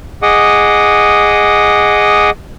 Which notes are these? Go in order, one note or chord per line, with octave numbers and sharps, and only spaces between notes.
G#4 D#5 F#5 D6 D#6